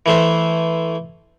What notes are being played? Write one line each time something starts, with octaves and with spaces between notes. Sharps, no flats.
E3 A3 C5